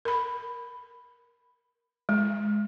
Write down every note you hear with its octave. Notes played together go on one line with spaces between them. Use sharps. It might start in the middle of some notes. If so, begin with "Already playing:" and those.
A#4 B5
G#3